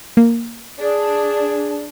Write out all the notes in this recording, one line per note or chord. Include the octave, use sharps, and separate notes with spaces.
A#3
D4 G#4